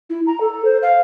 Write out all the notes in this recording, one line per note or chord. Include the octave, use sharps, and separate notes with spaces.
E4
A#5
A4
C5
F5